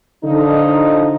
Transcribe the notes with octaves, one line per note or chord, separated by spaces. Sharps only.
D3 F3 D#4